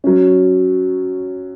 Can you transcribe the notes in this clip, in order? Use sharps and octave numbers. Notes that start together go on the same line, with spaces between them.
F#3 C#4